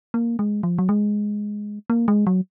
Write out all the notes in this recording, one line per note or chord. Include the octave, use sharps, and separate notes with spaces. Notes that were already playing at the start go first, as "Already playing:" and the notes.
A#3
G#3
F3
F#3
G#3
A#3
G#3
F#3